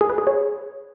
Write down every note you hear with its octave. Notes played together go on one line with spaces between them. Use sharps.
G#4
B4
G#4
C#5